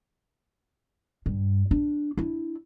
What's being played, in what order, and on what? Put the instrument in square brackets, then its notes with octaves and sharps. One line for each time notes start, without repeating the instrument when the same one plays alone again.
[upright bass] G2
D4
D4 E4